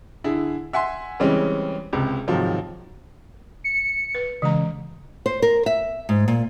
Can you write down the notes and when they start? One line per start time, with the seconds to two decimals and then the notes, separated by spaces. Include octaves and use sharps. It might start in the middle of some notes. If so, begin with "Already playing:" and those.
0.24 D3 E4 G#4
0.73 E5 F#5 G#5 C6
1.20 C#3 E3 G3 G#3 C4 C#4
1.93 C#2 C3
2.28 G#2 C3 D#3 F3 F#3
3.64 C#7
4.15 B4
4.42 C#3 E3 G#3 A#5
5.26 C5
5.42 A#4
5.66 E5
6.09 G#2
6.28 A#2